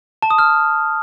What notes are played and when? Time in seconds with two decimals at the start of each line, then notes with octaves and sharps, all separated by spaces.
0.22 A5
0.30 D#6
0.39 F6